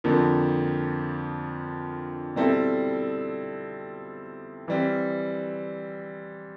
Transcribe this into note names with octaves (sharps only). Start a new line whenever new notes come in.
F2 D3 F3 A#3
B2 G3 C4 E4 A4
E3 G3 C4